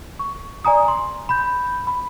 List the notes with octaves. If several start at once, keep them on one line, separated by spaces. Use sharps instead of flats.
C#6
D5 G#5 A#5 D#6
C6
B5 G6
B5